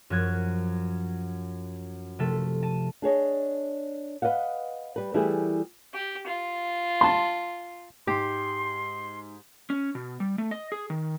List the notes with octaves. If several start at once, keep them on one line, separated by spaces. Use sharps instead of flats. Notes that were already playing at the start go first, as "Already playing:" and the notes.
F#2 F3 F#6 G#6
C3 F3 A3 A4
A5 D#7
D4 G#4 C#5 D#5
B4 D5 D#5 F5 F#5
G3 B4
E3 G3 A3 E4 G4 G#4
G4
F4
A5 C6
G#2 G4 C6
C#4
B2
G3
A3
D#5
G#4
D#3